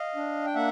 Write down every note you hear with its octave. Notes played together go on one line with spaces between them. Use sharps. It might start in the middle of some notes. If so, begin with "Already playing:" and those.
Already playing: D#5 F5
D4
G5
A#3 E5 F#5